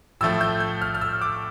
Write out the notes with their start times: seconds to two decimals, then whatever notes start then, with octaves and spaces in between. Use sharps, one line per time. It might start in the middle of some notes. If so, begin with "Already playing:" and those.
0.21 A2 F3 A3 E6
0.41 G6
0.60 G6
0.82 F6
0.95 F6
1.01 E6
1.21 D6